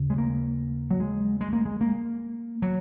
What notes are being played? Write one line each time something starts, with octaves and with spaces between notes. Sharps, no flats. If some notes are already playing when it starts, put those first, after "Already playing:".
Already playing: D#2 C#3
G#3
A#3
F#3
G#3
G#3
A#3
G#3
A#3
F#3